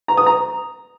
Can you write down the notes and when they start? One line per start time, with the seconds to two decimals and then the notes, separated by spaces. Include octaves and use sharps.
0.08 A#5
0.17 D#6
0.26 A#5